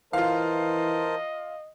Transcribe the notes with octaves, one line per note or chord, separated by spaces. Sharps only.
E3 F4 A#4 C5 D#5 F5 A5